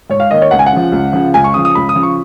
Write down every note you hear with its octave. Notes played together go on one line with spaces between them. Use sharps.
G#2 C#5
F5
D#3 A#3 D#5
C#5
C#2 F#5
G#5
F#5
C#3 F3
C#2
C#3 F3
C#2 G#5
C#6
C#3 F3 D#6
D#6
C#2 B5
D#6
C#3 F3
C#6